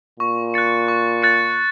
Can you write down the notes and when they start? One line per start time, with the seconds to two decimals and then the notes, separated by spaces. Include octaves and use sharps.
0.20 A#2 C#6
0.54 F#6 A6 C#7
0.88 C#6
1.22 F#6 A6 C#7